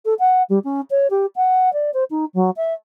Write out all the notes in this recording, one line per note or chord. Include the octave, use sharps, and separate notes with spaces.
A4
F#5
G3
C#4
C#5
G4
F#5
D5
C5
D#4
F#3
E5